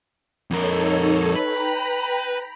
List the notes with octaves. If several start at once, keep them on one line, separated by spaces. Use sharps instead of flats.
F2 D#4 A4 A#4 C#5
B4 G5 A#5 B5